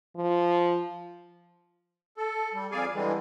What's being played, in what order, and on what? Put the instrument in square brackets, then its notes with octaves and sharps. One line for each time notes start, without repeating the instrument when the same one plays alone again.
[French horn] F3
[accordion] A4
G3
F2 G#4 D5 F5 G#5
D3 E3 G3 G#3